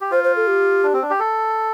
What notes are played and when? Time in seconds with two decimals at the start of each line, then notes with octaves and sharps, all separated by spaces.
0.01 G4
0.11 F4 C5
0.24 C5
0.36 A4
0.47 G4
0.83 D4
0.93 C4
1.02 D4
1.10 G4
1.20 A4